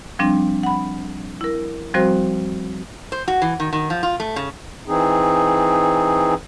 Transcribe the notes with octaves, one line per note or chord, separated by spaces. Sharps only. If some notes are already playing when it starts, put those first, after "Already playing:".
F3 G3 C4 D4
F#5 B5
E4 A#4
F3 G3 C4 F#4 C5
C5
F#4
E3
D#3
D#3
F3
F4
A3
C#3
E3 C4 D#4 G#4